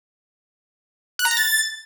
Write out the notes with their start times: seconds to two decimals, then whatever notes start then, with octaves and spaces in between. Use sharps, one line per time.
1.19 F#6
1.25 A#5
1.31 A#6
1.37 A6